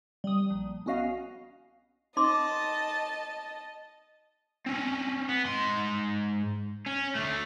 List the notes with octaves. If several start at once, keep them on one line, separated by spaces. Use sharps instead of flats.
G3 D#6
A#1
B3 C#4 F#4 D#5 F5
D#4 D#5 A5 C6 D6
C4 C#4
B3
G#2 C6
C#4
D3 A3